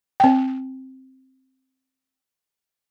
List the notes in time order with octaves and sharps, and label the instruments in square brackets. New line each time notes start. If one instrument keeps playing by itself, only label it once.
[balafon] C4 G5